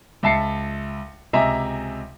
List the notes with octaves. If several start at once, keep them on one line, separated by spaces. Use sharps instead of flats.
C#2 E5 A5 C7 C#7
C#2 C3 D#5 E5 G#5 A#5